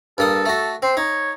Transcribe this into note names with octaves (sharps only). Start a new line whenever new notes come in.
G2 A#3 A4 D#6
A3 F#4
C4 C5
D#4 C#5